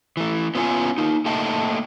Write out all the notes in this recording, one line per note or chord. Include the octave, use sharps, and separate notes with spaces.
E3 A3
B3 C#4 F4 G4 G#5
A#3 D#4
A3 A#3 D#5 G5 A5